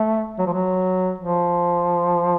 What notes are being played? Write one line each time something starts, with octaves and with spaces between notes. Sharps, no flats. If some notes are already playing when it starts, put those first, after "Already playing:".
Already playing: A3
F#3
F3
F#3
F3